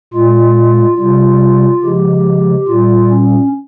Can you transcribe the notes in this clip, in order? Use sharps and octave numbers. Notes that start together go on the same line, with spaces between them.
A#2 G#3 F4
C3 G3 F4
C#3 F3 G#3 G4
A#2 G3 F4
C#4